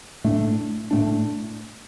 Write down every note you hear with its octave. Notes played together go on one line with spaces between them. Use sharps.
A2 A3 D4
A2 A3 D4